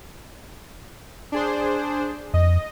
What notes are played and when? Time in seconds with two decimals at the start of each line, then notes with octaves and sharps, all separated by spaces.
1.32 D4 G#4 C5
2.34 F2 D#5